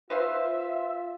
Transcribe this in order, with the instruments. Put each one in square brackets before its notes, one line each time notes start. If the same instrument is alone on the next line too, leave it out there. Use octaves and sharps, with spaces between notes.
[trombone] F4 [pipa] B4 C5 F5 [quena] E5